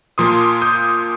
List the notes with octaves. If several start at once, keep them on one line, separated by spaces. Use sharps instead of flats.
A#2 F3 A#3 C6 D#6
D#6 G6